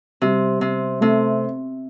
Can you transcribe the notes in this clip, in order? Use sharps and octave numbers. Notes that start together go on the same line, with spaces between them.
C3 G3
C3
C3 A3